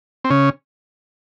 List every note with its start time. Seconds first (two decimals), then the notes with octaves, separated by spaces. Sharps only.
0.24 C4
0.30 C#3 C#4